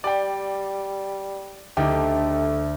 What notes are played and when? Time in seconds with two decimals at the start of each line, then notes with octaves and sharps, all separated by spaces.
0.04 G3 D5 G5
1.77 D2 A3 D#4 G4